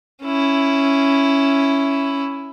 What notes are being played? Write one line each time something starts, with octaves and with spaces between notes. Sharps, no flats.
C#4 E4